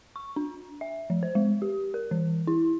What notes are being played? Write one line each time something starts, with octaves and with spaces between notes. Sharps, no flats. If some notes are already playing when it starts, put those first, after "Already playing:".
C#6
D4
E5
F3
C5
G#3
G4
A#4
E3
E4